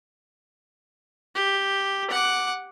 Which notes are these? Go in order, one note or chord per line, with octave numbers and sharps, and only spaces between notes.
G4
F#5 D6